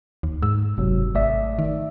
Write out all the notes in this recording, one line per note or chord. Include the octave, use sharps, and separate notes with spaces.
D#2
G#2 E6
F#1 C3 F#3
G#1 A3 D5 E5
D#3